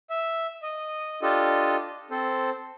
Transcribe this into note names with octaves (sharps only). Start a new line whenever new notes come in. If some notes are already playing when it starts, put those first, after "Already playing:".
E5
D#5
D4 F4 G4 A4 D#5
C4 A4 C5